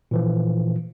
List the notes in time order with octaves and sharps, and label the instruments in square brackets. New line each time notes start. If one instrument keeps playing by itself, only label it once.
[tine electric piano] A#2 E3 F3